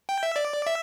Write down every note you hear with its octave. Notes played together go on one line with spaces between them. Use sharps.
G5
E5
D5
E5